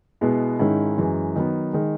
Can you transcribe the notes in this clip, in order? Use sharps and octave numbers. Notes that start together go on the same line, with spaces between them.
B2 G#3 B3 E4
G#2 D#3 G#3 C#4 E4
F#2 E3 G#3
D#3 F#3 B3
D#3 G#3